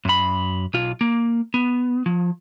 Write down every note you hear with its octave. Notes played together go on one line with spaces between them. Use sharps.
F#2 B5
B1 F4
A#3
B3
F3